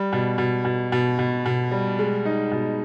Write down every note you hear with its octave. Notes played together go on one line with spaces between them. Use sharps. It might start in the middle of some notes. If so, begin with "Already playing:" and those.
Already playing: G3
B2
B2
B2
B2
B2
B2
G3
G#3
D#4
B2